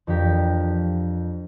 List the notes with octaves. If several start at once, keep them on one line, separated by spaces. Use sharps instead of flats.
F2 F3 D4 G4 A#4